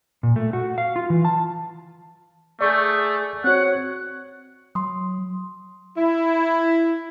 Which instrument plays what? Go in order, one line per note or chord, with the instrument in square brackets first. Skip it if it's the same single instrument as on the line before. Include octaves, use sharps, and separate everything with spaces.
[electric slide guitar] A#2
A3
F#4
F5
F4
E3
A5
[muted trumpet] A3 [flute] G#4 [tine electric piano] D5 C#6 G6
[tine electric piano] C4 F#4 [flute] C#5 [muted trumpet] F#5
[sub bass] F#3 [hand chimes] C6 D#6
[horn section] E4